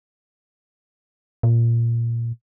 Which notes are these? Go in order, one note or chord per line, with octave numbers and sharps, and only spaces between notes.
A#2